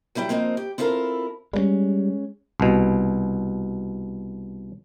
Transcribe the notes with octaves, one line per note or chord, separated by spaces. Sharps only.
F#3 G3 E4 F5 G5
F3 A#3 C4 D#4
G4
C4 E4 F4 A4 A#4
G3 G#3 A#3 C#4
C2 B2